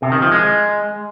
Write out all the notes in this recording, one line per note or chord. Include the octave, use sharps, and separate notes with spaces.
C3
D#3
F3
G#3